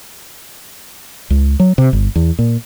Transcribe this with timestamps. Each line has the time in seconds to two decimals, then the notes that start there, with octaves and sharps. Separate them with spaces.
1.30 C#2
1.60 F#3
1.78 C3
1.93 G1
2.16 E2
2.39 A#2